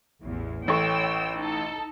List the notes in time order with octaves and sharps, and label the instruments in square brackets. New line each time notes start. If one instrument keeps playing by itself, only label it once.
[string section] A1 E2
[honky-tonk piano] A1 A3 C#6 [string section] C#5 G5 E6
[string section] D#4 A4